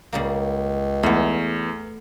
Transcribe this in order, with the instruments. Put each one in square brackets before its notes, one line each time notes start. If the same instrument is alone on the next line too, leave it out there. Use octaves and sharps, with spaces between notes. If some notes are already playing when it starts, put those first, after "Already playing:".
[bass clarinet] C#2 [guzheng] C#3 G3 A#3
[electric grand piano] E2 [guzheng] A3 B3